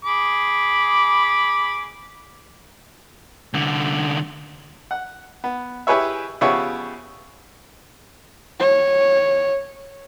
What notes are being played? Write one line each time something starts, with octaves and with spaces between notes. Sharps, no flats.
G#4 B5 D6
C2 D3
F#5
B3
E4 G4 G#4 B4 C#5 E5
C#3 F3 B3 G4 C#5 E5
C#5